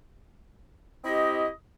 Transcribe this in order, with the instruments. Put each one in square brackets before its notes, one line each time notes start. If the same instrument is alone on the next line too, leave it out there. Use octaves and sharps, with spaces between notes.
[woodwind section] C4 E4 G4 D#5